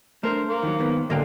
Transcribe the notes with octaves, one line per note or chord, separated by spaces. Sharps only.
A3 D4 A#4 C5
A#3
D#3 F#3
G#2 D#3 B3
A1 D3 A#3 D#5 F5 G5